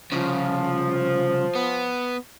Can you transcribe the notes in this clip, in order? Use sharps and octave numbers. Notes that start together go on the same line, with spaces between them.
C2 C#3 F3
B3